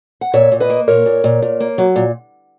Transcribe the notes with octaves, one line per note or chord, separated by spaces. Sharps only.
F#5
A#2 C#5 E5
A#2
B4 D#5
A#3
A#2 A#4 C#5
A#2
A#2
A#2
A#3
F#3
A#2